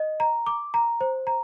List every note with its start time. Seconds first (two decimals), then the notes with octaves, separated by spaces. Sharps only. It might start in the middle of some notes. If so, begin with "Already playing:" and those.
Already playing: D#5
0.20 A#5
0.46 D6
0.74 A#5
1.01 C5
1.27 A#5